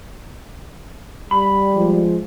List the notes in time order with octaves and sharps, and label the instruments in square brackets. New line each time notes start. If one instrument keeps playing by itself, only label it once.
[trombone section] G3 [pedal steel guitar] B5
[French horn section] F3 G#3